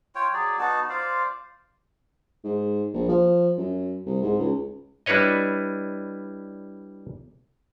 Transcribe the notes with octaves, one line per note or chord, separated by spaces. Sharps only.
F4 C#5 G5
F#3 G#4 D5
B3 D#4 F#4 A5
F4 C5 D5 F5
G#2
A#1
F3
F#2
C2
G#2
C#2
G3 D4 E4 B4 C#5 D#5